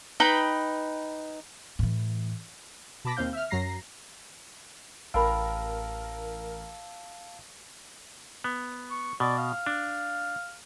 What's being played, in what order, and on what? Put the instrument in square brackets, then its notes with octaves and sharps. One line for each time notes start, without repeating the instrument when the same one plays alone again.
[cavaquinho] D#4 B4 G5 B5
[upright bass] A2 E3
[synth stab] B2 A5 B5 D6 A#6 B6
D#2 C4 F5 G6
E5 F6
F#2 F#3 A#5 A#6 C7
[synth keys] A1 A#4 [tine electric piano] F5 A5 E6 [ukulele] G5 B5
[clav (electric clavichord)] B3
[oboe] C#6
[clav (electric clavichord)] B2 [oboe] D5
[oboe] F5
[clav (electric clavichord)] D4